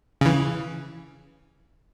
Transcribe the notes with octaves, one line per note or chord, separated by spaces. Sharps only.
C#3 E3